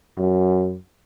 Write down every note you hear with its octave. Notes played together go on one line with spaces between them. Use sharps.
F#2